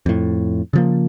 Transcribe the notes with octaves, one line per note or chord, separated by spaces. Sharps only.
F2 A2
C#3 F3 A#3